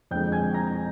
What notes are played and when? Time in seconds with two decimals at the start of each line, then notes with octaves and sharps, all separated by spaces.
0.11 F2 D3 G#3 G5 G6
0.32 G#5 G#6
0.54 A#5 A#6